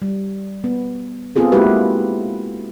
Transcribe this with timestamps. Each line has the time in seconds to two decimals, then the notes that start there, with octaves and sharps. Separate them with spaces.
0.02 G3
0.64 B3
1.36 B3 C4 F4 G#4 A4
1.52 G#3 A#3 E4 F#4 G4 B4